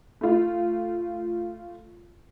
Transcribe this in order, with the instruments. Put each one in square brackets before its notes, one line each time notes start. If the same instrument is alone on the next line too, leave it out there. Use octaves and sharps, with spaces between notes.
[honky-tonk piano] A3 F4